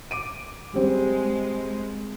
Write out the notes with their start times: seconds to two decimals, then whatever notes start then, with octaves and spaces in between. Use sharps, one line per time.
0.11 D6 D7 D#7
0.74 G3 G#3 C4 G4